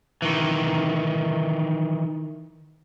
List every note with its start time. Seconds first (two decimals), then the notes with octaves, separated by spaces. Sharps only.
0.22 D#3 E3